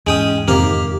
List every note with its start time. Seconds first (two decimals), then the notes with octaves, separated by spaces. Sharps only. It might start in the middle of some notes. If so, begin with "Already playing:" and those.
0.07 E2 G#2 G#3 C#4 G5 D#6
0.48 F2 C3 D#3 A#3 G4 F5